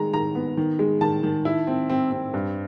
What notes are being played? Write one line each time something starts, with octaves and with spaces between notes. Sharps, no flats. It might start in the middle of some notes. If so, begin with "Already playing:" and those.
Already playing: D#3 G#3 A#5
D#3 A#5
B3
D#3
G#3
D#3 A5
D#3
E4
C4
C4
C4
G2